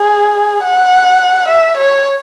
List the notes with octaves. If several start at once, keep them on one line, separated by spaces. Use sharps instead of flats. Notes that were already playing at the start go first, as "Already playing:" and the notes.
Already playing: G#4
F#5
E5
C#5